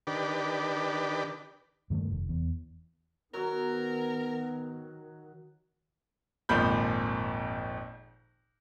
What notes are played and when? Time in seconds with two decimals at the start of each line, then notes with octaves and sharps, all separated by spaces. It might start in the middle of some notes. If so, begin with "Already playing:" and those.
0.07 D#3 D4 G4 B4
1.90 G2 D#3 F#3 A3
2.10 F1
2.29 E2
3.34 D#3 F#3 B3 F#4 A#4
6.49 G#1 F2 A#2 F3 B5 G6